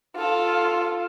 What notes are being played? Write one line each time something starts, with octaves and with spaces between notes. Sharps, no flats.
F4 A4